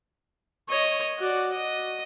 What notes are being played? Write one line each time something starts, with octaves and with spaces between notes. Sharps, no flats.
C#5 D#5
F#4 D5
D#5